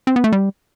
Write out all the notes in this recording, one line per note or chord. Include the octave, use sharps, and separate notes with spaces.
C4
B3
A3
G3